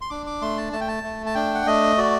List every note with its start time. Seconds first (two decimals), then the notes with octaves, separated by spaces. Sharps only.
0.01 C6
0.10 D4 D6
0.26 D6
0.41 A3 C6
0.57 A5
0.73 A3 A5
0.81 G5
0.88 A5
1.04 A3
1.26 A5
1.35 D4 G5
1.55 F#5
1.66 A3 D#5
1.98 F#4 D5